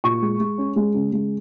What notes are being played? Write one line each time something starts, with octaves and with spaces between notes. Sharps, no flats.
A#2 C#6
G#3
G#3
C#4
G#3
C#3
G#3